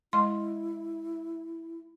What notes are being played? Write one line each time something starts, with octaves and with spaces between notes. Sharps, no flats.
G#3 E4 D#5 C6